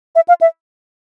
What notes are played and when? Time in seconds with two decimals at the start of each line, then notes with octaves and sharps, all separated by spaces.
0.15 E5
0.28 F5
0.41 E5